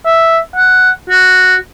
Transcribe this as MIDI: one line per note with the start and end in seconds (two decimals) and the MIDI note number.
0.05 0.38 76
0.56 0.90 78
1.10 1.55 66